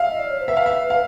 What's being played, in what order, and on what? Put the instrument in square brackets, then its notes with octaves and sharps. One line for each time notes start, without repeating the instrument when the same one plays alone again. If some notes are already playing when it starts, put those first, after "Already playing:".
Already playing: [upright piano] E5 F5
[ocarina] D#5
D5
C#5
C5
[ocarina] B4 [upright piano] E5
[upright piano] F5
E5
F5